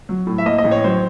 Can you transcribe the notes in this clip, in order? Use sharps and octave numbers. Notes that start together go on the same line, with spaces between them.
F#3
A2
E5
A#3 D#5
D#5
A1
C#5
F#3 C5